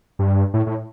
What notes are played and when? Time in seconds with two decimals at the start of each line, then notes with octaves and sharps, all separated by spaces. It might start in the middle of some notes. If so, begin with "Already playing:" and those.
0.19 G2
0.54 A2
0.67 A2